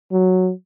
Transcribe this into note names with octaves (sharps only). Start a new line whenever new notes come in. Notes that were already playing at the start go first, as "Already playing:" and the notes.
F#3